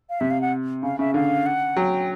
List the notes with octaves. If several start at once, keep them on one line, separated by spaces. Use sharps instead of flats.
F5
C3 E5
F5
F#5
C#3 F5
C#3 E5
D3 F5
F#5
F#3 G5